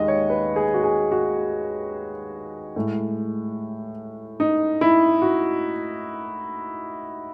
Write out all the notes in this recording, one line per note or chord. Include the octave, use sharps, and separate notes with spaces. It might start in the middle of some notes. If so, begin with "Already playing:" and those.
Already playing: D#2 D#3 G#3 D#5
C#5
B4
G#4
F#4
G#4
F#4
A2 G#3
D#4
E4
F#4